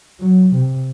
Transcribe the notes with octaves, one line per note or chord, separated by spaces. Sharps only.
F#3
C3